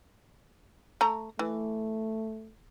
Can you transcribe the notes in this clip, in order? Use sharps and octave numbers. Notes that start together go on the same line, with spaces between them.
A3 A#5
E3 A3